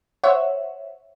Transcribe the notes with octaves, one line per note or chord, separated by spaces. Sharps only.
C5 C#5 E5 F#5